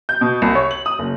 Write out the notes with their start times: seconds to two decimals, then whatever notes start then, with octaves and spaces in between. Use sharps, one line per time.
0.09 G6
0.21 B2
0.42 C2
0.55 C#5
0.71 F#7
0.86 D#6
0.99 F#1